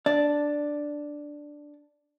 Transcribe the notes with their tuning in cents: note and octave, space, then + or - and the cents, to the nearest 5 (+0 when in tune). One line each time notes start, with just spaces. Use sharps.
D4 +0 D5 +0